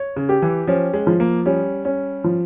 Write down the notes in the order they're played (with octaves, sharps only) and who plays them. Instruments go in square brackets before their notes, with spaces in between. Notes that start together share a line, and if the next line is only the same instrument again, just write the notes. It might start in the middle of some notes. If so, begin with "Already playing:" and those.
Already playing: [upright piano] C#5
[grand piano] C#3
[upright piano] G4
[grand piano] E3
[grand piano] F3 [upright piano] C#4
[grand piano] G#3
[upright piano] F3
[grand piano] A#3
[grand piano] G3 [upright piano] C#4
[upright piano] C#4
F3